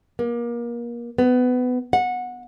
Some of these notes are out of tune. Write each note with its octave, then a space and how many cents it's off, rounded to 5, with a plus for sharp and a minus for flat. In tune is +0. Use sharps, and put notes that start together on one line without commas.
A#3 +30
B3 +20
F#5 -20